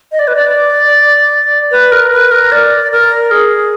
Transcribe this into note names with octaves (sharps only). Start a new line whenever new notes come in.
D#5
D5
B4
D5
B4
A#4
B4
A#4
D5
A#4
G#4